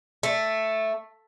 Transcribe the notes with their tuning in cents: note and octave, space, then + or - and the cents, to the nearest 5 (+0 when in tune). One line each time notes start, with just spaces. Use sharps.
A3 +0